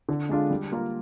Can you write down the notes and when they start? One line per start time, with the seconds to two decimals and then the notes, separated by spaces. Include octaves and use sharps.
0.09 D3
0.29 G#3 D4 F4
0.50 G3
0.72 A#3 F4 A#4